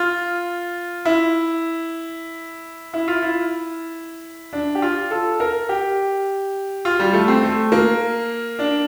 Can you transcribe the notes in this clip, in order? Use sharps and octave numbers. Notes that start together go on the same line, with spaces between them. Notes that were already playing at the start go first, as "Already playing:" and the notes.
Already playing: F4
E4
E4
F4
E4
D4
G4
F4
A4
A#4
G4
F4
G3
A3
C4
A3
A#3
D4